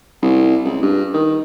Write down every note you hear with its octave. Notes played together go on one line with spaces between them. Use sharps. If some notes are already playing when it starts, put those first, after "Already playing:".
C2
C#2
G2
D#3